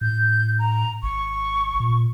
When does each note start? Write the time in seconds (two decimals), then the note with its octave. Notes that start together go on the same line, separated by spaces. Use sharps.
0.01 A2 G6
0.59 A#5
1.03 G#1 C#6
1.80 A#2